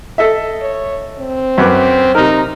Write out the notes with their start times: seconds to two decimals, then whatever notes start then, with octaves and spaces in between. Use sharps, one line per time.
0.18 A4 D#5 E5
0.62 C#5
1.19 C4
1.58 F#2 B4 D6
2.15 C3 D#4 A#4